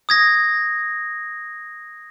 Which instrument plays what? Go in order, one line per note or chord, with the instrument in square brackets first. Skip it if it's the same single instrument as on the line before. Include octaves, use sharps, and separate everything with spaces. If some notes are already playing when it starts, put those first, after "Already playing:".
[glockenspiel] D#6 G#6 A#6